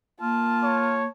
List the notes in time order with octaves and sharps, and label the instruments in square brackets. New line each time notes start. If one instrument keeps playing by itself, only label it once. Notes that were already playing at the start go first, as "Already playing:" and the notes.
[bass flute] A#3 [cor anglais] F4 [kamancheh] A5
[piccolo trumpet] C#5